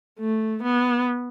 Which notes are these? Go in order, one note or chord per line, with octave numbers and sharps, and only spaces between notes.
A3
B3